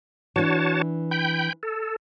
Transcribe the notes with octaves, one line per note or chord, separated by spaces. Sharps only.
E3 D4 F#4 C#5 A5
G5 B5 G6
A4